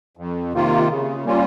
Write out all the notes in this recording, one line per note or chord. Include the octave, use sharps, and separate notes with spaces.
F2
C3 D#3 A#3 F4
C#3
G3 A#3 C#4 F4